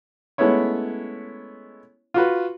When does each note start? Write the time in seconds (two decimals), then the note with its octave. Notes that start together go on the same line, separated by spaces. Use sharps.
0.38 G#3 A3 B3 C#4 E4 C#5
2.14 F4 F#4 B4